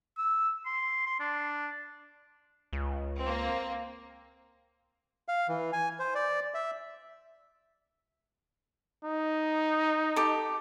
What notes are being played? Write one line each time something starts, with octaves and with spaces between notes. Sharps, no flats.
E6
C6
C6
D4
C#2
A#3 C4
F5
E3
G#5
C5
D5
E5
D#4
G4 A4